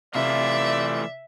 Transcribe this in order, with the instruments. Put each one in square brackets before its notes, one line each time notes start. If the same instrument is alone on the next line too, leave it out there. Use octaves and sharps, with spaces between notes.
[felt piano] C3 [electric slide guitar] E3 A3 F4 [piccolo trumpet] D5 [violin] E5